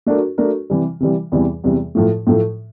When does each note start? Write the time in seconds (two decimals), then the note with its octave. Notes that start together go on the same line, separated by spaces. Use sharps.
0.06 A3 D4 F#4 A#4
0.38 A3 D4 F#4 A#4
0.70 C3 E3 G3
1.00 C3 E3 G3
1.32 E2 C3 E3 G3
1.64 E2 C3 E3 G3
1.95 A2 F3 A3
2.27 A2 F3 A3